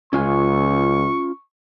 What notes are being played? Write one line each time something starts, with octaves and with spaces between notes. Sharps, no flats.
C#2 C#4 F4 G#5 C#6